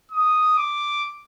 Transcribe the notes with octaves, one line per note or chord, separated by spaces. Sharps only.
D#6
D6